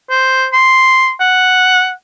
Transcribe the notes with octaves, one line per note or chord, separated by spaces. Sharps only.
C5
C6
F#5